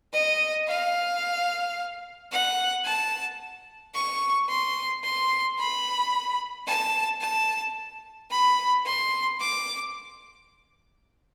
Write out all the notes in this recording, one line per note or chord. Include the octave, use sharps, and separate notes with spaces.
D#5
F5
F#5
A5
C#6
C6
C6
B5
A5
A5
B5
C6
D6